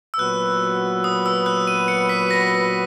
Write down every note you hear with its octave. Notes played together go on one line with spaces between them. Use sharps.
E6
A#2 F#3 B3 F#4 B4 F#6
D#6
E6
F#6
D#7
C#7
B6
A#6